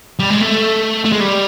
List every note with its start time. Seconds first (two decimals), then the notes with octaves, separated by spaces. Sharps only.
0.19 G3
0.30 G#3
0.41 A3
1.05 A3
1.13 G#3
1.21 G3